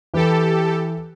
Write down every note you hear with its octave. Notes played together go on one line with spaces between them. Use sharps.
E3 G4 A4 B4